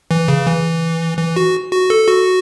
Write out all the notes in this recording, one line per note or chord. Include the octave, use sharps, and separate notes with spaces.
E3
C#3
E3
E3
F#4
F#4
A4
F#4